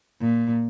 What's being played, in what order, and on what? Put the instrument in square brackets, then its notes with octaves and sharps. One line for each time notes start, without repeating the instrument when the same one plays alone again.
[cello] A#2